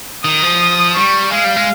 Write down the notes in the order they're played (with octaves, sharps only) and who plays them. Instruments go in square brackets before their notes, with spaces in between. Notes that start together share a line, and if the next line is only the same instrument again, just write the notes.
[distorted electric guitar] D#3 [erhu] D#6
[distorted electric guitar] F3
[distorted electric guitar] G3 [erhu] C#6
[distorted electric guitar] G#3 [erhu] F5
[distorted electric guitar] G3
G#3